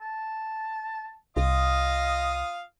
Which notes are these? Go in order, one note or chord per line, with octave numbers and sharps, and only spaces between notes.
A5
C2 F4 D#5 F5 D#6